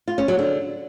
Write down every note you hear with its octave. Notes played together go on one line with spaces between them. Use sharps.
F4
C#4
F#3
D3